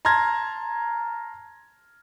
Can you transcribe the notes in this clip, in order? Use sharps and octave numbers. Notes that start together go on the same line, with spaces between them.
A5 A#5 C6 F6 G#6 A#6